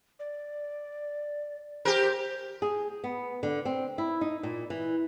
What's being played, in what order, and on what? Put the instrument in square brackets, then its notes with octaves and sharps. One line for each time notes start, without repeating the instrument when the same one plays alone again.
[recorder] D5
[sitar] G4 A#4 [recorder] C5
[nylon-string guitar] G#4
B3
D3
C4
E4
D#4
A#2
E3